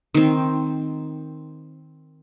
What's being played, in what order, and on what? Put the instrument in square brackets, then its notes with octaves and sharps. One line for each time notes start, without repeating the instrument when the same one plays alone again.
[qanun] D#3 C4